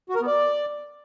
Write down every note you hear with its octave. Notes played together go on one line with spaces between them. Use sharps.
F#4
A#4
B3
D5